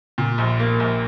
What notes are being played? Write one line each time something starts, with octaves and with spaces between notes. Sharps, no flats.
A#2
A#1
A#3
A#1